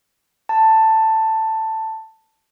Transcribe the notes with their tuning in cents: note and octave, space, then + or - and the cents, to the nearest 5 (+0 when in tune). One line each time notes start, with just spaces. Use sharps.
A5 +10